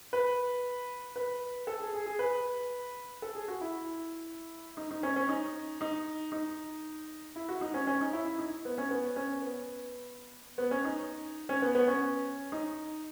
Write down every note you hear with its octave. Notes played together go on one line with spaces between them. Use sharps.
B4
B4
A4
G#4
G#4
G#4
B4
A4
G#4
F#4
E4
D#4
D#4
C#4
C#4
D#4
D#4
D#4
E4
F#4
D#4
C#4
C#4
D#4
E4
E4
D#4
B3
C#4
B3
C#4
B3
B3
C#4
D#4
C#4
B3
B3
C#4
D#4